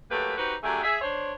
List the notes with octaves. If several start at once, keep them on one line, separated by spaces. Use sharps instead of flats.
F#3 A3 A#3 G4 B4
C4 D#4 F#4 G4 B4 C5
D3 F#3 A3 G4 G#4
G#4 E5
D4 C5 C#5